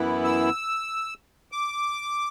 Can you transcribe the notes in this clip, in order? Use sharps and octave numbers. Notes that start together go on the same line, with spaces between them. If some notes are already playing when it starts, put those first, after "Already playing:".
Already playing: F#2 E3 B3 E4
E6
D6